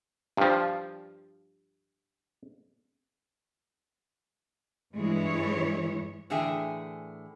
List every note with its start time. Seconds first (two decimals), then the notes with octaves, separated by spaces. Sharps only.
0.37 G2 F3
4.96 G2 E3 G#3 E4 C#5
6.30 A2 D3 E3 G#4 E5 G5